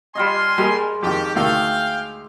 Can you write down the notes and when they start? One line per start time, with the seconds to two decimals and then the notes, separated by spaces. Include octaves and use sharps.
0.15 G3 D4 F4 D#5 G#5 C6
0.58 G3 G#3 A#3 G#4
1.03 F2 D#3 G4
1.35 D2 D#3 A3 F5 G5